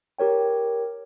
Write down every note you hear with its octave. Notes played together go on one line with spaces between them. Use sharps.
G4 A#4 C#5 G5